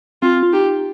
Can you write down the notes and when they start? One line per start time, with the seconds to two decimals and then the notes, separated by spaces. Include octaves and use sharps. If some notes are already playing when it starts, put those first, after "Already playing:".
0.22 C4 F4
0.43 F4
0.53 D#4 G4